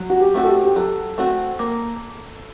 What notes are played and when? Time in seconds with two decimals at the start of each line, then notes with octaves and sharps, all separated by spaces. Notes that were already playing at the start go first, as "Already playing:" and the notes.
Already playing: F#3
0.10 F#4
0.20 G4
0.34 A3 C4 F#4
0.44 A4
0.48 G4
0.65 G4
0.76 F#3 A4
1.18 A3 C4 F#4
1.59 A#3